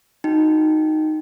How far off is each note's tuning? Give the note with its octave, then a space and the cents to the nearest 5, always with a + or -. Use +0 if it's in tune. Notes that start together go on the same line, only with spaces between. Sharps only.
D#4 +0 F#4 -15 G5 +0